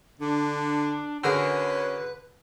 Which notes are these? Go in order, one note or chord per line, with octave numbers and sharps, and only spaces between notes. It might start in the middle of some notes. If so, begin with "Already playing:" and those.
D3 D4
D3 C#4 F#4 G#4 A#4 B4